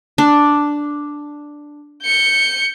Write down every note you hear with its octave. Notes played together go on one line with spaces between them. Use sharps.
D4
G6 C#7